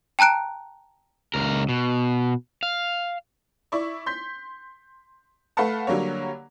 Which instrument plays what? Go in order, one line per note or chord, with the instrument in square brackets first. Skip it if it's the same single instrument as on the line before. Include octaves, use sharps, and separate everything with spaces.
[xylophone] G5 A5 A#5 F#6 D7
[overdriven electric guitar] C#2 A#4
B2
F5
[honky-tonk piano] E4 D5 C#6
C6 G6 B6
A3 B4 F5 F#5 A5
D3 F#3 G3 A#3 C#5